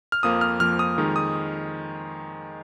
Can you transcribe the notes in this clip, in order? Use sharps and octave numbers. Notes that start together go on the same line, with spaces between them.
F6
F2 F3 A#3 D#6
F6
F2 F3 A#3 F6
D#6
F2 D#3 G#3
D#6